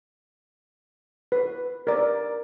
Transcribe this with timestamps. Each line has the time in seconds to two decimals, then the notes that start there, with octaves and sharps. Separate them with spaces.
1.32 B4
1.87 A#4 D5